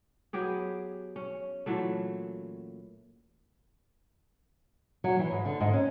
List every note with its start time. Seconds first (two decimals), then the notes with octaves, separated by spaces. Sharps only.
0.33 F#3 B3 G4 G#4
1.16 C#4
1.66 A#2 E3 F#3 A3
5.04 F#3
5.19 E3
5.31 G#2
5.45 D3
5.60 G#2
5.73 C#4